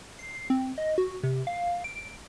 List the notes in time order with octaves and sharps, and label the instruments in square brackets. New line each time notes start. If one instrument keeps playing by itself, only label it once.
[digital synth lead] C7
C4
D#5
F#4
C3
F5
D7